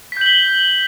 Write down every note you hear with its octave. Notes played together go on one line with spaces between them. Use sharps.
G6 B6 F#7 G7